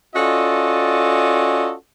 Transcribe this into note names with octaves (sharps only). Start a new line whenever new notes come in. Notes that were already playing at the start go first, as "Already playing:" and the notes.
C#4 F4 F#4 A4 D5 D#5